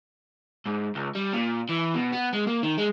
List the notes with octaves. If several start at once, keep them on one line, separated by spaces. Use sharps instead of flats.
G#2
C#2
G3
A#2
E3
B2
B3
G#3
A#3
D#3
G#3